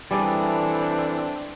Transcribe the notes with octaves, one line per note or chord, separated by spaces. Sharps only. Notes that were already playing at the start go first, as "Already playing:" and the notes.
E3 G3 C4 D4 G#4 A4 D5